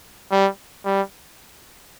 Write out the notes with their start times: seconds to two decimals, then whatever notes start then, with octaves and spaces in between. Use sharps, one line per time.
0.32 G3
0.85 G3